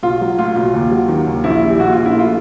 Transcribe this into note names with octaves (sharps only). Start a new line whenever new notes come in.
B1 F4
F#3
A2 F4
B1
D#2
F#3
D#3
D#2
A#1 E4
G3
A#2 F#4
A#1 F4
E4
A3 F4